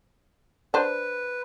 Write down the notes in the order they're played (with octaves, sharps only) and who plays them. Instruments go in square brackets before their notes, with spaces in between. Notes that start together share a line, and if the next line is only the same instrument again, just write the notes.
[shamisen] D4 C5 [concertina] B4